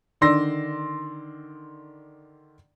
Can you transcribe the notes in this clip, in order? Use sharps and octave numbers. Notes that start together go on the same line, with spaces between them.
D3 D#3 D5 C6 E6 A#6